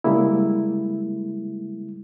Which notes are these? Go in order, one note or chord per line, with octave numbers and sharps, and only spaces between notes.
C#3 G3 G#3 A#3 E4